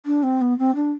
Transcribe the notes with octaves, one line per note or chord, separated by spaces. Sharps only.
D4
C4
B3
C4
D4